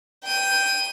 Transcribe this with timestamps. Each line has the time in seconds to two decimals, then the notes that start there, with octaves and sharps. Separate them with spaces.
0.25 G5 D#7